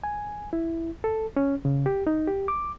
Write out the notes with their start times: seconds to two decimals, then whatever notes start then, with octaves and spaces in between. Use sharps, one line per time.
0.04 G#5
0.53 E4
1.04 A4
1.36 C#4
1.65 C#3
1.86 G4
2.07 D#4
2.27 G4
2.48 D6